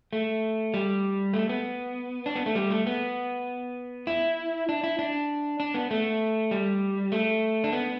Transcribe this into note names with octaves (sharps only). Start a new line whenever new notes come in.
A3
G3
A3
B3
D4
B3
A3
G3
A3
B3
E4
D4
E4
D4
D4
B3
A3
G3
A3
D4
B3